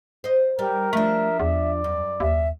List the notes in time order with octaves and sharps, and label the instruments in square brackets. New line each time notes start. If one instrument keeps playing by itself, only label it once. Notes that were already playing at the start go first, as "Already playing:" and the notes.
[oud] C5 D#5
[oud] G3 [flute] G4 [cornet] A#4
[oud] F3 D4 [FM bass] A3 [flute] E5
[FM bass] E2 [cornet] D5
[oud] F#2
[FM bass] D#2 [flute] E5